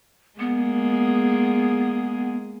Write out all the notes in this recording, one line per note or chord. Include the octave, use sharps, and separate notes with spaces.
G#3 A#3 B3 G#4